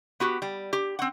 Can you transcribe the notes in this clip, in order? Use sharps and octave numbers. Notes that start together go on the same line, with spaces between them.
B3 F#4 G4
G3
G4
C4 F#5